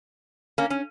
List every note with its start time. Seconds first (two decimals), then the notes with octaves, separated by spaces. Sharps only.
0.58 A#3 C#4
0.70 C#4